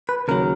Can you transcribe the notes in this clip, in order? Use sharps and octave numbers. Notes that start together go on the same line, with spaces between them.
B4
D#2 C#3 F#3 A#4